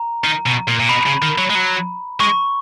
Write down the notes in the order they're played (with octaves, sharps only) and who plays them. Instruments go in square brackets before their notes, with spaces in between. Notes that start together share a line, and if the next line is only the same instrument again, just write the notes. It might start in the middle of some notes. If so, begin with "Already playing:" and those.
Already playing: [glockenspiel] A#5
[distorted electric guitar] D#3
B2
A#2
A#2
[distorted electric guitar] B2 [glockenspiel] B5
[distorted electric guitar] C#3
D#3
F#3
G#3
F#3
[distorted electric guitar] G#3 [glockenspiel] C#6